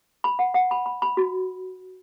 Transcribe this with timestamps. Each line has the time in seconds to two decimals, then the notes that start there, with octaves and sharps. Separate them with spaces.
0.24 B5
0.39 F#5
0.54 F#5
0.71 B5
0.86 B5
1.02 B5
1.17 F#4